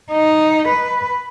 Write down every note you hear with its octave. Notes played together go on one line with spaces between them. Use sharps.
D#4
B4